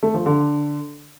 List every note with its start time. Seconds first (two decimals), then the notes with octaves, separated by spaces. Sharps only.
0.03 A3
0.14 F3
0.26 D3